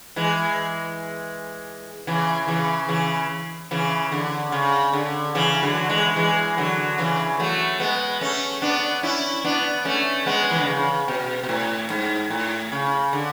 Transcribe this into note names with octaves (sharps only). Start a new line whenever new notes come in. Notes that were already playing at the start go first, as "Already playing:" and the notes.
E3 G#3
C#3 E3
C#3 E3
C#3 E3
C#3 E3
D3
C#3
D3
C#3 E3
D3 F#3
E3 G#3
E3 G#3
D3 F#3
C#3 E3
F#3 A3
G#3 B3
A3 C#4
B3 D4
C#4 E4
B3 D4
A3 C#4
G#3 B3
E3
D3
C#3
B2
B2
A2
G#2
A2
C#3
D3